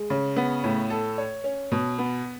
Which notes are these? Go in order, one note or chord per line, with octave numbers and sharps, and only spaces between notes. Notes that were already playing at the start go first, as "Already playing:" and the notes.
Already playing: G#3
C#3
B3
A2
A4
C#5
C#4
B2
B3